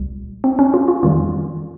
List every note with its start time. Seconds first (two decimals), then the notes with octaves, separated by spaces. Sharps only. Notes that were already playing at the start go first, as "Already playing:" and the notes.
Already playing: C2 A#2 G3
0.44 C4
0.59 C#4
0.74 F4
0.88 F4
1.03 F2 D#3 G3 F4